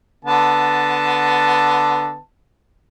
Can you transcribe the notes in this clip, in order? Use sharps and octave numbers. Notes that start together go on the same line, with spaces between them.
D3 B3 A5